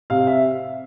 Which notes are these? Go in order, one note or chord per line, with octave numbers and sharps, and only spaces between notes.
C3 F5
E5